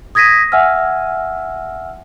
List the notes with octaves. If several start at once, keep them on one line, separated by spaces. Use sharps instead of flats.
D#6 G#6 A#6 B6 D#7
E5 F#5 G#5 E6 F6